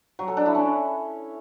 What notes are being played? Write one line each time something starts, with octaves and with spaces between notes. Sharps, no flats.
F#3
A4
D4
E4
C#4